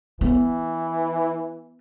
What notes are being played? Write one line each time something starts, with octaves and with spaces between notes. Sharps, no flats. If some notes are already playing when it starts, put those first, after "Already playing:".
E3 B3